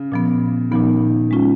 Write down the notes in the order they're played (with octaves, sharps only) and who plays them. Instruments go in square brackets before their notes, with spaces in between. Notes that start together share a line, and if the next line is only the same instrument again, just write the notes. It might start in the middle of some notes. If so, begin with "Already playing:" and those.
Already playing: [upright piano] C#3
[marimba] A#2 F3 B3
[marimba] A#2 F3 B3 [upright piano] D#3
[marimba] G#3 C#4 F4